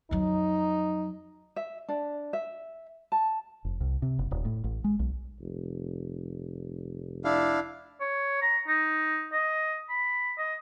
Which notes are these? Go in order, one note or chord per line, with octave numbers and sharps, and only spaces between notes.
F2 F#3 D#4
E5
D4
E5
A5
F1
C2
C3
F#1
D#1
A2
A1
G#3
B1
F1
D4 E4 F5
C#5
A#5
D#4
D#5
B5
D#5